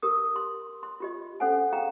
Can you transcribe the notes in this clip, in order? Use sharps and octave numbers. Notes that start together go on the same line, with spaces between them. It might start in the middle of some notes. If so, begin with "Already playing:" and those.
G4 A#4 D#6
C6
C6
F4 G4 D#5
C#4 A4 C5 F#5 G#5
G#4 F5 G5 A#5